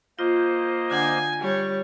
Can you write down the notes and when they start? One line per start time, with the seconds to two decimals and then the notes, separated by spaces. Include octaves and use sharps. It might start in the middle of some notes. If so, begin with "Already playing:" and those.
0.19 A#3 F4 C5 D#5
0.91 D3 D4 F#5 G#5
1.40 G3 C#5